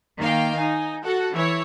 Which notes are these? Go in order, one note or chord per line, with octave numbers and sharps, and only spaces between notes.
D#3 A#3 F5 G5
D#4 G#5
F#4 A4 F#5
E3 E4 C#5